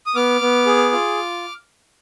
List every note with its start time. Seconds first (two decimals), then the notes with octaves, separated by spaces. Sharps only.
0.06 D#6
0.15 B3 D6 F6
0.41 B3
0.66 G#4
0.93 F4